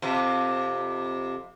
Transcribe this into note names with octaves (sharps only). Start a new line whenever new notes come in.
F2 C3